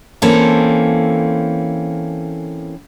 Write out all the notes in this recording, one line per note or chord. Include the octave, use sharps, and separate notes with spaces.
E3 A#3 C4 C#4 A4